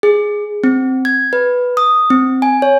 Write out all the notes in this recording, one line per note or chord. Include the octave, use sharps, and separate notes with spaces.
G#4
C4
G#6
B4
D#6
C4
G#5
C#5